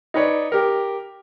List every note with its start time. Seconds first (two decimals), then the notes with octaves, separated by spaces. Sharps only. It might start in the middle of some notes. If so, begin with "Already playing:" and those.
0.14 D#4 B4 C#5 D5
0.52 G4 A#4